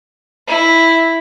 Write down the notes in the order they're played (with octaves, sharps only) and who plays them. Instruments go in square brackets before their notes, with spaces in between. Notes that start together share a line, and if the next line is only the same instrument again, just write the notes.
[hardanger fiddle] E4